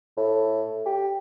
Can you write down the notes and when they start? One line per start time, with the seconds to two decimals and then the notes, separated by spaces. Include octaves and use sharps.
0.17 A2
0.85 G4